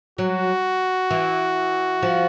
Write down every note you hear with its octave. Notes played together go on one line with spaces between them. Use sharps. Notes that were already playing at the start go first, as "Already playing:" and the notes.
F#3 F#4
E3
F3